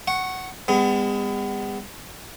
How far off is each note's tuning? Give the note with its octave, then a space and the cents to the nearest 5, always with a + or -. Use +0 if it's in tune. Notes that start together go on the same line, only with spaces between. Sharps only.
F#5 +10 C#6 -15
G#3 -40 B3 +30